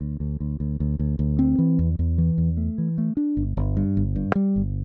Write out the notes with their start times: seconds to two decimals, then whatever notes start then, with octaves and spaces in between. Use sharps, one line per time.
0.01 D2
0.20 D2
0.40 D2
0.60 D2
0.80 D2
0.99 D2
1.19 D2
1.39 C4
1.58 E3
1.79 E2
1.99 E2
2.18 E3
2.38 E2
2.57 A3
2.78 E3
2.98 A3
3.17 D4
3.37 G1
3.57 G1
3.77 G2
3.97 G1
4.16 G2
4.35 G3
4.56 G1